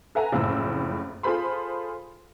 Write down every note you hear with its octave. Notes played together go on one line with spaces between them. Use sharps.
A4 B4 E5 F#5 G#5 A#5
F#1 F2 A2 E6
F4 G#4 A4 C5 B5 C6